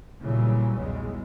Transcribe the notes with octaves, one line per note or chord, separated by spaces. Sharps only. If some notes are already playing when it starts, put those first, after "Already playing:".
A#2 C#3 E3 F#3 G3
B1 E2 C#3 G3 G#3